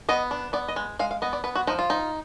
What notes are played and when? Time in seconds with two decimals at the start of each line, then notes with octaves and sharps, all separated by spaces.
0.09 B3 D#5
0.31 D4
0.53 B3 D5
0.68 D#5
0.76 G#3
0.99 G#3 F5
1.11 F5
1.22 B3 D#5
1.33 D5
1.44 B3 B4
1.55 F#4
1.67 F3 D#4
1.79 F4
1.90 D#4